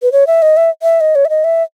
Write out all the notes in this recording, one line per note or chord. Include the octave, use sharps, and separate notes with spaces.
B4
C#5
E5
D#5
E5
E5
D#5
C#5
E5
D#5
E5